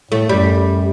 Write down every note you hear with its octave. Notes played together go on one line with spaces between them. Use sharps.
A2 A3
F#2 G3